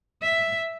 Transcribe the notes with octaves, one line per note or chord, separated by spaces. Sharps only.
E5